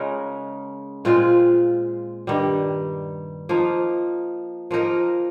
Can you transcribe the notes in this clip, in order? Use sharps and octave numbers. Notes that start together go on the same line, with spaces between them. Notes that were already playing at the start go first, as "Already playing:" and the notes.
Already playing: C#3 G#3 D#4 A#4
A#2 G#3 C4 F4
G2 D#3 G3
F3 A#3 D#4
F3 A#3 D#4 A#4